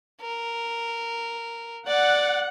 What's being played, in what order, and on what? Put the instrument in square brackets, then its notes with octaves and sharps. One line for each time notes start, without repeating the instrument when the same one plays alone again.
[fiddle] A#4
[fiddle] D5 [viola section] F#5